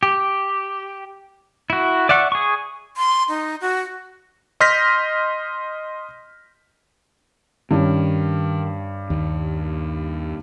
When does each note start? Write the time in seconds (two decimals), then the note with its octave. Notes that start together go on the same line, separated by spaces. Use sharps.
0.03 G4
1.70 E4 F#4
2.09 D5 E5 F#5 C#6
2.32 G#4 C#6
2.97 C6
3.29 D#4
3.61 F#4
4.60 D#5 C6 F6 G6 A#6 B6
7.71 G2 D#3 C#4
9.10 D#2